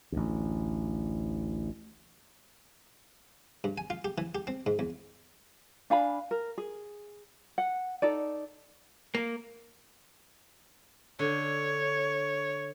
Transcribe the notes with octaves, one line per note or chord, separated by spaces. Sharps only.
A1 D2
G2
G#5
F4
G4
E3
G4
C4
G#2
E2
D4 F5 G#5 B5
A#4
G#4
F#5
D#4 A4 D5
A#3
D3 C#5